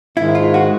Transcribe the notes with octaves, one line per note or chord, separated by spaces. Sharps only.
G#2 D#3 G#3 E4
F4
F#4